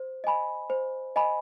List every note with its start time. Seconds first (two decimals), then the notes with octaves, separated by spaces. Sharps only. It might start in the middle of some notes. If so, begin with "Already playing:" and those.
Already playing: C5
0.24 D#5 G#5 B5
0.70 C5
1.16 D#5 G#5 B5